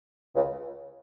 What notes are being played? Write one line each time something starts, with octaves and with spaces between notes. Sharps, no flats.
C#2 C#3